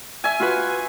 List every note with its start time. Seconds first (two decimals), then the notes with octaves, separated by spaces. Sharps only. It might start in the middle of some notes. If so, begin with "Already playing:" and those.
0.24 E5 G#5
0.40 F4 F#4 B4